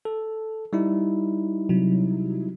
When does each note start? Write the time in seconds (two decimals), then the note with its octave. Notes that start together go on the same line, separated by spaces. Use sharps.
0.05 A4
0.73 G3 D#4 E4
1.69 C3 F#3